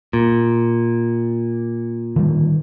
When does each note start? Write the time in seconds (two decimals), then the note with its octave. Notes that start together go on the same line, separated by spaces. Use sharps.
0.13 A#2
2.16 D3 D#3 G3